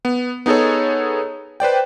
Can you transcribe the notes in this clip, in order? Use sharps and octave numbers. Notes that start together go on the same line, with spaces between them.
B3
B3 D#4 G#4 A4 C#5
B4 C5 D5 G5